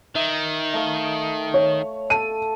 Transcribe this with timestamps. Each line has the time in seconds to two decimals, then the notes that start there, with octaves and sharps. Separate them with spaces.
0.15 D#3 E5
0.73 A3 F5
1.54 C#5
2.10 A4 D#7